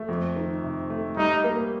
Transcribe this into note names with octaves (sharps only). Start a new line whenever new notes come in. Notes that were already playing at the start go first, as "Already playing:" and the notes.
Already playing: A3
F2
D#3
C3
A3
G3 D#4
A#3